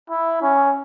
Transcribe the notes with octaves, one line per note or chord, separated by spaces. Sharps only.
E4
C#4